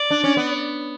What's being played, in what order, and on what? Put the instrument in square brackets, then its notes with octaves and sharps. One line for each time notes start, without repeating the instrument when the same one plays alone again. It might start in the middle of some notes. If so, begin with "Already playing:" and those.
Already playing: [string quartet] D5
[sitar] D4
C#4
B3